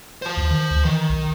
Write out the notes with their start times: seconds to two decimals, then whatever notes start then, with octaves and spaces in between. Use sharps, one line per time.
0.22 C5 A5
0.37 D#2
0.51 D#3
0.71 D2
0.85 D#3 E3
1.09 B1